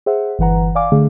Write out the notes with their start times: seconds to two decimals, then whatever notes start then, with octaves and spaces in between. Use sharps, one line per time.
0.06 G#4 C5 E5 F#5
0.39 G1 E3 B4 F#5 A#5
0.75 D5 F5 G#5 D6
0.92 D3 A3 G#4 F5